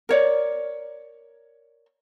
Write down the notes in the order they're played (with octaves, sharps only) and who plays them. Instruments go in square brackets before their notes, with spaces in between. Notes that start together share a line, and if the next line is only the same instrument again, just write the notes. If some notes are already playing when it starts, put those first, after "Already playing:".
[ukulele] A#4 C#5 D5